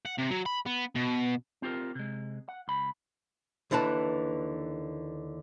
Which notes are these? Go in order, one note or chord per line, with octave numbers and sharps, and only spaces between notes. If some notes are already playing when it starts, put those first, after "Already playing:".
F#5
C3
F#3
B5
B3
B2
C4 F4 G4 A4 A#4
C3 G#3
F#5
C#2 B5
D#2 D3 E3 B4 A5